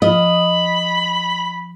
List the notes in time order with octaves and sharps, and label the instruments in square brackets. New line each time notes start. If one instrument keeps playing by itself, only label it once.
[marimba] F3 F4 [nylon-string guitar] D#5 [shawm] B5